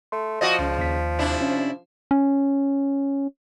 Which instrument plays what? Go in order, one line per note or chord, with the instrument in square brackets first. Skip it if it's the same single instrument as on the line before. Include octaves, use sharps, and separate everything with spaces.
[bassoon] A3 [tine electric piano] C6
[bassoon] F3 [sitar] F#4 D5 D#5
[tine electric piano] C#2 [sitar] C#3
[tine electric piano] D#2 B6
[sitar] C3 D4 E4
[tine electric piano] C#4
[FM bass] C#4